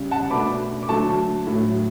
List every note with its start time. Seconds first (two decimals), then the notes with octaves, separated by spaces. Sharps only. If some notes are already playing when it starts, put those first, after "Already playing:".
Already playing: C#3 G3 C#4
0.11 F#5 A5
0.30 B2 A3 D4 B5 D6
0.83 D6
0.88 D3 F#3 A3 A5 C#6
1.47 A2 F#3 A3